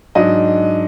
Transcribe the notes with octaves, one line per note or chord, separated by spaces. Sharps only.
G#2 F#3 D4 D#5